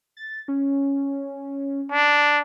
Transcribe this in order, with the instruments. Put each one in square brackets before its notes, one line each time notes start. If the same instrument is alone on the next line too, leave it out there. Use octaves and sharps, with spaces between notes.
[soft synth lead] A6
C#4
[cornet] D4